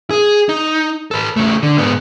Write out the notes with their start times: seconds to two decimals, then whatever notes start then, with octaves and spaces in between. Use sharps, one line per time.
0.10 G#4
0.49 D#4
1.11 A4 B4
1.36 C#3 A3
1.63 D3
1.78 G#2 B3